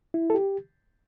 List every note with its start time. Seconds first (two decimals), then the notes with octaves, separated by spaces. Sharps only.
0.14 E4
0.30 A4
0.35 G4